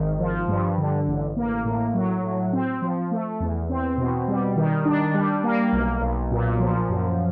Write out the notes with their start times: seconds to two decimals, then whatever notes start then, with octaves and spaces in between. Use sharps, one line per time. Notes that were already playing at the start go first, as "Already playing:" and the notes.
Already playing: G#1 D#3
0.19 F3
0.48 G2
0.78 D3
1.07 A1
1.37 A#3
1.65 A2
1.94 F#3
2.23 A2
2.53 C4
2.82 F3
3.11 A3
3.40 E2
3.69 C4
3.98 B2
4.28 G3
4.56 D#3
4.85 D4
5.14 G3
5.43 A#3
5.72 B1
6.02 B1
6.31 A#2
6.60 F3
6.89 F#2